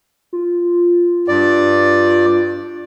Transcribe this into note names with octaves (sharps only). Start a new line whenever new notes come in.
F4
G2 D5